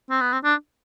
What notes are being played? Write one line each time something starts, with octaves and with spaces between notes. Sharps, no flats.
C4
B3
C4
D4